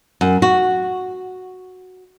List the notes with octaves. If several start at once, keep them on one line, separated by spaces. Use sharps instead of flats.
F#2
F#4